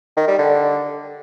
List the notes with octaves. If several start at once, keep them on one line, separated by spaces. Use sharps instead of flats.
D#3
G3
D3